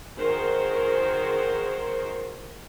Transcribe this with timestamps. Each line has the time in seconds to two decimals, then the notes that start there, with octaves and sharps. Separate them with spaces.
0.17 D#3 F#4 G#4 A#4 C5